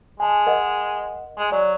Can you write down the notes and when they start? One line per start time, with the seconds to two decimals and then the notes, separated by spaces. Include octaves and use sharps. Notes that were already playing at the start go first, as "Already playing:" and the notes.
0.20 G#3 G#5 A5
0.47 A#4 D#5 F#5
1.37 G#3
1.52 F#3 D5